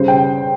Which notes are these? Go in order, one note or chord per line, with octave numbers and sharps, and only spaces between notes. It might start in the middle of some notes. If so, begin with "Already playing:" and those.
Already playing: C#3 G3 C5
G5